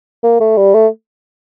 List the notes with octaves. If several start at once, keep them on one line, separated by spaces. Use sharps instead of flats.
A#3
A3
G3
A3